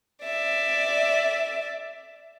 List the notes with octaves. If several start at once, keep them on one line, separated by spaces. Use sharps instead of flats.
D5 E5